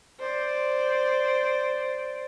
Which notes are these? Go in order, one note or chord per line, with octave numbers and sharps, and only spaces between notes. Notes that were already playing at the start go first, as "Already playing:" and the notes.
C5 D5